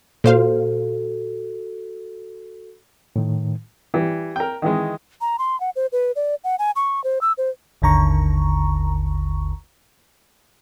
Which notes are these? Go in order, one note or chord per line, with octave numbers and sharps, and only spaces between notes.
A#2 F#4 A4 C5 F5
A2 D#3
E3 G3
A#4 G5
D#3 E3 G#3
A#5
C6
F#5
C5
B4
D5
F#5
G#5
C#6
C5
E6
C5
G#1 D#2 D3 A#5 C#6